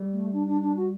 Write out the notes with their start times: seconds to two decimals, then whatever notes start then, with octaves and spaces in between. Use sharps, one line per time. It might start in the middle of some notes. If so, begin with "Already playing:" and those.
Already playing: G3
0.12 A3
0.32 D4
0.46 D4
0.61 D4
0.76 F#4